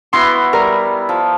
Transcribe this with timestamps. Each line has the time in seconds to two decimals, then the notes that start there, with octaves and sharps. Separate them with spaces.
0.13 B3 E4 F#4 C6
0.53 G3 A#4
1.09 F3